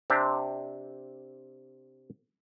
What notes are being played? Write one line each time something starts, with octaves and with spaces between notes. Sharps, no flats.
C3 C4 D4 G4